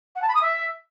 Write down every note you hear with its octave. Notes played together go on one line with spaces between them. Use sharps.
F#5
A5
B5
D#6
E5